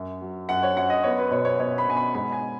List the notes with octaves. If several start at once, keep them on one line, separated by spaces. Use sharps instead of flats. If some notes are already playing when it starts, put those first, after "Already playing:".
Already playing: F#2
F#3
F#2 F#5
C#5
F#2 F#5
D#5
B3 C#5
B4
B2 C#5
C#5
B2 C#5
B5
B2 G#5
B5
G#2 B5
G#5